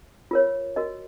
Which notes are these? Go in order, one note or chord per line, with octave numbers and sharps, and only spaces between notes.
F4 A#4 C#5
F#4 A#4 D#5